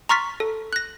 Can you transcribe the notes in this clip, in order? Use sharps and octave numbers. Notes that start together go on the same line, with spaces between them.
A#5 C6 C#6 F6 A6 B6
A4
F#6 A#6